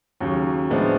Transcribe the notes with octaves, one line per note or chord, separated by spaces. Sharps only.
D#2 C#3 F#3
A2 F3 G#3 B3 D4